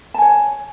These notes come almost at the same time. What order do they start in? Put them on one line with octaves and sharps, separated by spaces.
A5 G#5 C#5